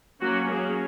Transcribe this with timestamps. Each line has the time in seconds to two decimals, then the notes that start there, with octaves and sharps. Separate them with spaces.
0.21 F#3 A#3 C#4 F#4
0.50 F#3 A#3 C#4 G#4